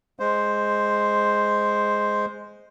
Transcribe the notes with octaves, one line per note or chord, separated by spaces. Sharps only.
G#3 C5